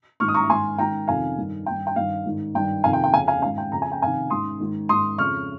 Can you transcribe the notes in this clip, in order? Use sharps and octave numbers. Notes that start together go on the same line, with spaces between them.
G#2 D#3 C#6 F6
D#6
A#5 C#6
G#2 D#3 G#5 C6
G#2 D#3 G5 A#5
F2 C3 D#3 F5 G#5
G2 D#3
G2 D#3 G5
G5
G2 D#3 F5
G#2 D#3
G2 D#3 G5
F2 C3 D#3 F5 G#5
G5
G5
F2 C#3 F5 G#5
F5 G#5
G#2 D#3 F5 G#5
G5
F2 C#3 A#5
G#5
G5
F2 C3 D#3 F5 G#5
G#2 D#3 C6 D#6
G#2 D#3
G#2 D#3 C6 D#6
F2 C#3 C#6 F6